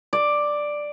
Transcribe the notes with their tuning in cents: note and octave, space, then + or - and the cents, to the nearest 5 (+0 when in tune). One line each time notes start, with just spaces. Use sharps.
D5 +5